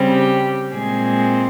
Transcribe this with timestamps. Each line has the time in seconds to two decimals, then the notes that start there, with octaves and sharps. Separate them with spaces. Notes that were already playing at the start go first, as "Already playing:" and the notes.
Already playing: C#3 G3 C4
0.10 G4
0.74 A#2 G#3 C4 G#4